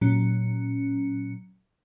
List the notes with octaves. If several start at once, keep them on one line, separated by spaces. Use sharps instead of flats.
A#2 F#3 C#4 C#7